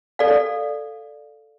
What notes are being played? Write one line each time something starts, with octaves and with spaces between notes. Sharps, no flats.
A4 D5 F5